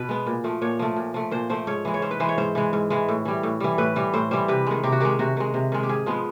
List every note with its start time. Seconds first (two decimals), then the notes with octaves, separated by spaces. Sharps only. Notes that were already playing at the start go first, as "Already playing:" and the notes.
Already playing: B2 B4
0.09 G#3 B3
0.26 A#2
0.44 F3 A3
0.62 A#2 C#5
0.79 F3 A3
0.96 A#2
1.14 F3 A3
1.31 A#2 C5
1.50 F3 A3 C5
1.67 G#2 C#5
1.85 E3 G#3
1.94 C#5
2.02 G#2 C5
2.11 B4
2.20 E3 G#3 C5
2.29 C#5
2.38 G#2 C5
2.55 E3 G#3
2.73 G#2
2.90 E3 G#3
3.08 A2
3.25 E3 G3
3.43 A2
3.60 E3 G3
3.78 A2 B4
3.96 E3 G3
4.13 A2 C5
4.31 E3 G3 C5
4.48 C3 B4
4.67 D#3 G#3
4.83 C3 G4
4.92 F#4
5.00 D#3 G#3 G4
5.19 C3 F#4
5.37 D#3 G#3
5.54 C3
5.72 D#3 G#3
5.83 G4
5.89 G#2 G#4
6.06 F3 G#3 B3